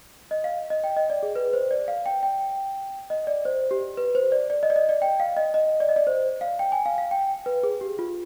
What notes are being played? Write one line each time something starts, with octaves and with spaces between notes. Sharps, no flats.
D#5
F5
D#5
G5
D#5
D5
G#4
B4
C5
D5
F5
G5
G5
D#5
D5
C5
G4
B4
C5
D5
D5
D#5
D5
D#5
D5
G5
F5
D#5
D#5
D5
D#5
D5
C5
F5
G5
G#5
F5
F5
G5
B4
G#4
G4
F4